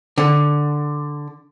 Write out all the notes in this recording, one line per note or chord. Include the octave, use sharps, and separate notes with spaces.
D3